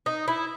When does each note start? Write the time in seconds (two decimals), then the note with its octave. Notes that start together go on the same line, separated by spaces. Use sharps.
0.06 D#4
0.28 E4